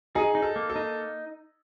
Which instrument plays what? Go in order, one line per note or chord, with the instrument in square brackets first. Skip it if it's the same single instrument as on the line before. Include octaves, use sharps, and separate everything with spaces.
[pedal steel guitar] D#4 [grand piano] G#4
[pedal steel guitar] D#4
[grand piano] A4
[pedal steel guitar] A#3
[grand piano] A4
[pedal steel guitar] D#4